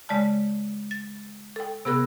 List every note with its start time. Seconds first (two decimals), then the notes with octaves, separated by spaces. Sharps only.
0.09 C#3 G#3 D5 A5
0.91 A6
1.56 A4 G5
1.85 C3 B3 G#4 A#4 E6 F#6